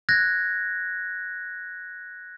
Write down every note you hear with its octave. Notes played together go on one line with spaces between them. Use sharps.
F#6 G#6 A#6